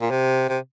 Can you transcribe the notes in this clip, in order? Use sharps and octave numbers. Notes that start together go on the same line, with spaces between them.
A#2
C3
C3